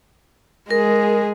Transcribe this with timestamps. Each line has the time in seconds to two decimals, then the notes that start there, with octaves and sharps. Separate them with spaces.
0.71 G#3 G#4 A#4